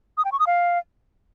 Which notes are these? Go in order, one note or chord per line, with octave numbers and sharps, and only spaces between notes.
D#6
G5
C#6
D#6
F5